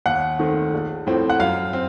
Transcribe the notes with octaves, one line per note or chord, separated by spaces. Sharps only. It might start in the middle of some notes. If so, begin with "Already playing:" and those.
D#2 F#5
D#3 A3 C4
A#1
A2 F3 C4
F#5
F#2 F5
C4